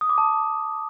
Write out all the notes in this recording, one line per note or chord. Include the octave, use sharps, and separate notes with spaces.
D#6
D6
A5